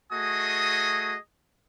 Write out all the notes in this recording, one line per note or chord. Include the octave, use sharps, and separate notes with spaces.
A3 F#4 G#4 D#5 G#5 D#6